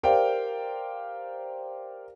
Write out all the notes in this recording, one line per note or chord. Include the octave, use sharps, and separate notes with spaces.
G4 A#4 C5 D5 F5 G5